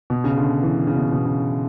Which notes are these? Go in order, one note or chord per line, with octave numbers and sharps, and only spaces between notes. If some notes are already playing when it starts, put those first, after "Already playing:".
B2
C#3
D3
E3
C#3
B2
B2
C#3